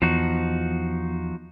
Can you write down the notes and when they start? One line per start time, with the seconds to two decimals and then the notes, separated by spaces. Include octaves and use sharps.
0.02 E2 F3 D#4 F#4